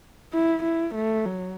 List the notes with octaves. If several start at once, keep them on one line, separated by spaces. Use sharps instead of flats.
E4
E4
A3
F#3